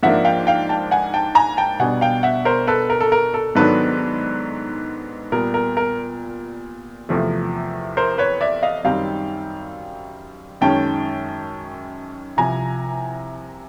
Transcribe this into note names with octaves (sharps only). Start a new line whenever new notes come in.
G#2 F3 A#3 D4 E5 F#5
F5 G5
F5 G5
G5 A5
F#5 G#5
G5 A5
G#5 A#5
G5 A5
B2 G3 B3 D4 F#5 G#5
F5 G5
E5 F#5
A#4 C5
A4 B4
A#4
A4
A#4
A4
G#2 D#3 F#3 B3 D4 A4 B4
A#2 G3 B3 A#4
A#4
A#4
E2 C3 F3 A3
A#4 C5
B4 C#5
D5 E5
D#5 F5
F#2 D#3 G3 C4 D#4 F5 G5
F#2 D#3 G#3 C#4 G5 A5
C2 C3 F3 G#5 A#5